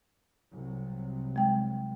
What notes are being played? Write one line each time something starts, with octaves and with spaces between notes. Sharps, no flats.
C2 C3 F#3
G#3 G5